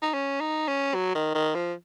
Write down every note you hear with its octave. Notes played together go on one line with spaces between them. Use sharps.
D#4
C#4
D#4
C#4
F#3
D#3
D#3
F3